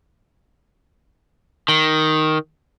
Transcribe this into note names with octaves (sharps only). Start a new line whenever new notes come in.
D#3